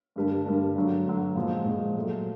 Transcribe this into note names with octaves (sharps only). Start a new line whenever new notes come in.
G2 D3 G3 A#3 D4
G2 D3 G3 A#3 D4
G2 D3 F#3
G2 D3 F#3
A#2 F3 G#3
A#2 F3 G#3
A#2 F#3 A3